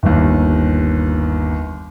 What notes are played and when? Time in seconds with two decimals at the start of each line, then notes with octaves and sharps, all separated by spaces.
0.03 G1 D#2